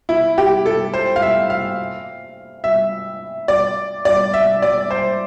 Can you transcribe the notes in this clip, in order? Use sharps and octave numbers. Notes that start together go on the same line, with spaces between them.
E4
G4
A4
C5
F5
E5
F5
E5
D5
D5
E5
D5
C5